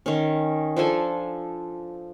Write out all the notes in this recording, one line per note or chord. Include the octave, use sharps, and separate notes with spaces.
D#3 C#4
F3 D4 A4 G#5